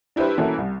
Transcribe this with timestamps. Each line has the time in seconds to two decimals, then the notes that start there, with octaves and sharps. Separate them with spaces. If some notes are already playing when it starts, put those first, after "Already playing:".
0.16 D4 E4 G4 B4 C5
0.38 E3 A#3 C#4 E4 F#4 A4
0.58 C2